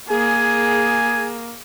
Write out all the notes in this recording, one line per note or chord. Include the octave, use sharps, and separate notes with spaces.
A#3 G#4 G#5